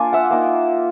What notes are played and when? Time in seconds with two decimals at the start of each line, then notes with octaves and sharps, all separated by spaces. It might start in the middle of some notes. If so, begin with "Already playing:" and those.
Already playing: A#3 D4 F4 G#5
0.13 E5 F#5
0.31 A#3 D#4